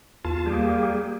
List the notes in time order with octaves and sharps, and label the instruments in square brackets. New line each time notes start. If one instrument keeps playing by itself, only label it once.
[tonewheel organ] E2 F4 A5
[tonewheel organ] G3 G4 G#4 [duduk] A#3